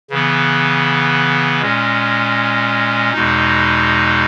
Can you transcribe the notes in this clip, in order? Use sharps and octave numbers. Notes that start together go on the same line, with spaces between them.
C#3 E3 B3
A#2 G#3 C#4
E2 B2 G#3 D#4